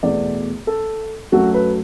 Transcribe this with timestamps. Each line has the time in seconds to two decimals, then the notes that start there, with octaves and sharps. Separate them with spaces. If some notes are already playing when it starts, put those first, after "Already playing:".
0.03 E2 B2 A3 D5
0.67 A4
1.32 F#2 F#3 A3 F#4
1.54 B4